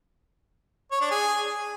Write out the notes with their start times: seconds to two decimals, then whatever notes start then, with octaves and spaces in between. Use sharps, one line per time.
0.92 C#5
1.01 D4
1.11 G#4